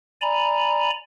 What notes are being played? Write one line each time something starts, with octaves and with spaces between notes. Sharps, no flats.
D5 G#5 A#5 B5